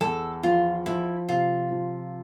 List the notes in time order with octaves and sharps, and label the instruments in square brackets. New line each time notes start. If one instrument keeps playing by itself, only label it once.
[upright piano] E2 [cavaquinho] A4
[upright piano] F3 [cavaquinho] F4
[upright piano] F3 [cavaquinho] E4
[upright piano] C3 [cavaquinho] F4
[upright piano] F3